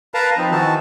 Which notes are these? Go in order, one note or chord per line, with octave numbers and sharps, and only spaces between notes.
A#4 B4 F5 A5 A#5
F3 C4 D#4
D#3 E3 F#4 A5